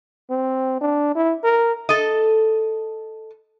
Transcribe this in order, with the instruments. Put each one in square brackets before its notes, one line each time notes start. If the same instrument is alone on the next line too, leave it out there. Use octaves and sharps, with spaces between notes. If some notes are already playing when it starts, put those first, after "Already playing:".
[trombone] C4
D4
E4
A#4
[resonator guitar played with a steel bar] A4 D#5